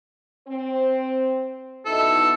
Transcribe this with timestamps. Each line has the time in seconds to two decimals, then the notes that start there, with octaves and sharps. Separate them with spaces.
0.48 C4
1.85 B2 D#4 E4 A4